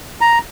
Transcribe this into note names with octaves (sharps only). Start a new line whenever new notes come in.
A#5